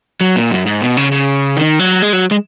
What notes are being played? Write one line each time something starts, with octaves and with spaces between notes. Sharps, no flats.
F#3
A#2
F#2
G#2
B2
C#3
C#3
D#3
F#3
G#3
F#3
G#3